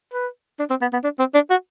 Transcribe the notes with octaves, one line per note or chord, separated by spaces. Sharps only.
B4
D4
C4
B3
B3
D4
C4
D4
F#4